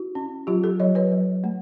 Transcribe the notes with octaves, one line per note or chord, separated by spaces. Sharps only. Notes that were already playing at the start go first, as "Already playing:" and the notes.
Already playing: E4 F#4
C#4
F#3 F4 G4
G4 A4
F#3 C#5 D#5
B4 C#5
F#3
A3